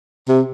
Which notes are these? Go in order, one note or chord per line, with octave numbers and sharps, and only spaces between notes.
C3